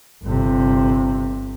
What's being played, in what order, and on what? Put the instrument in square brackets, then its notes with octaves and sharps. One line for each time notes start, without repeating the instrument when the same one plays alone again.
[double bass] G1 C3